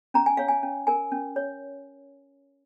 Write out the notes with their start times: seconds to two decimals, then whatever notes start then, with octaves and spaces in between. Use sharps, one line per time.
0.14 C#4 A#5
0.26 G#5
0.37 C#5 F5
0.48 G#5
0.63 C#4
0.87 A#4 G#5
1.12 C#4
1.36 C#5